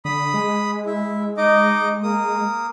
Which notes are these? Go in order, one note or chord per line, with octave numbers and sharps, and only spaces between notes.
D3 B5 D#6
G#3
E4
D#4 D#5 D6
A#3 D#6